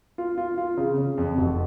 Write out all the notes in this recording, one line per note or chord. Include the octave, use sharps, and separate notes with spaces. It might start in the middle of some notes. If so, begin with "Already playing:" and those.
F4
F4
F4
C#3
C#3
F2
F1